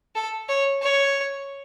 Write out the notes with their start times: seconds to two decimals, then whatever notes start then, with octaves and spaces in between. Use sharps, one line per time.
0.15 A4
0.49 C#5
0.82 C#5